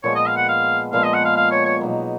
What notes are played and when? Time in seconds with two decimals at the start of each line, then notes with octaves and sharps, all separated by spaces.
0.03 A#2 F3 G#3 B3 C#5
0.15 D#5
0.26 F5
0.36 F#5
0.48 F5
0.93 A#2 F3 G#3 B3 F5
1.04 D#5
1.14 F#5
1.25 F5
1.36 F5
1.51 C#5
1.66 C#5
1.81 B2 F#3 A#3 D#4